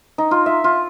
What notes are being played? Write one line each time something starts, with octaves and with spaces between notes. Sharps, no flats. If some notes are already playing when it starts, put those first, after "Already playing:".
D#4
F4
E5
F4